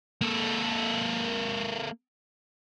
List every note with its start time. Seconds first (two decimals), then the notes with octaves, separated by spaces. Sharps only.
0.21 A#3 A4